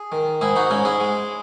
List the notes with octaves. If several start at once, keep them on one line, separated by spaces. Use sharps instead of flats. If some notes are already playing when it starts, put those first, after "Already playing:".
Already playing: G#4
D#3
G#2 E4 G#4
D#4 F#4
G#2 C#4 E4
E4 G#4
G#3